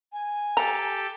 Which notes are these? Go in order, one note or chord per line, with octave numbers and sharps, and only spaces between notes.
G#5
G4 A4 A#5